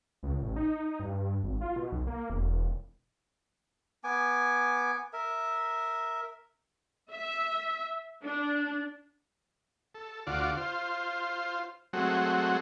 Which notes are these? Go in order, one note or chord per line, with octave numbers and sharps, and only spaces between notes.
C#2
A1
D#4
G2
G#1
F4
B2
B1
A#3
E1
B3 G#5 D6
A#4 E5
E5
D4
A4
D2 F4 F#4 D5
F4 C5
F#3 G#3 A3 C4 F#4